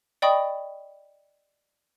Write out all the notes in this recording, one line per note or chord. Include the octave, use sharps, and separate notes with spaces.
D5 D#5 G5 B5 C#6 D#6